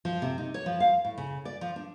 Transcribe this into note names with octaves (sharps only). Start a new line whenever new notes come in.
F3
C3
D#4
C#5
F3
F5
A2
C#3
D5
F3
D4